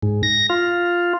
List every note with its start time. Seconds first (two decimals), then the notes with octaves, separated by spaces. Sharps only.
0.03 G#2
0.23 A#6
0.50 F4